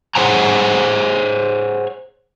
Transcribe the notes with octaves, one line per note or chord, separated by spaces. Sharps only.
G#4 C5 C#5 F#5 G#5 A#5